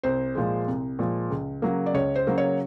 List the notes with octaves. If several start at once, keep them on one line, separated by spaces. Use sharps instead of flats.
C2 C5
A#2 F3 G#3
C2
A#2 F3 G#3
C#2
C#3 F#3 A#3
D5
C#2 C#5
C5
C#3 F#3 A#3
C#5